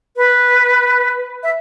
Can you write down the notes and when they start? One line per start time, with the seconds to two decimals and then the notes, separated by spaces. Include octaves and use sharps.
0.17 B4
1.43 E5